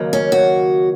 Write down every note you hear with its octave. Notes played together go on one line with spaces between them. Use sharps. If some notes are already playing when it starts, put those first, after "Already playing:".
Already playing: D#2 C#3 F#3 A#3
C#4
F#4